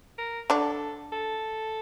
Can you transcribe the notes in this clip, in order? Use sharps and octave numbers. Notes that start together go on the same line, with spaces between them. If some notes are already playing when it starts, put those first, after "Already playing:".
A#4
D3 D4 A4
A4